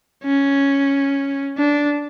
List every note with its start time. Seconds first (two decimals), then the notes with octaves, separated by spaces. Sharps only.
0.24 C#4
1.58 D4